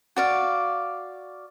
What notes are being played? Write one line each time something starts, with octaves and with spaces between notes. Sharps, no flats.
F#4 D5 F5